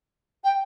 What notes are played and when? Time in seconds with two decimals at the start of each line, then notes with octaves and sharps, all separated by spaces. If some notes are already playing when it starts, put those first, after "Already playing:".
0.43 G5